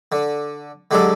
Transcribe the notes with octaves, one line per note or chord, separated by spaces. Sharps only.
D3
D3 F#3 G#3 G4 A4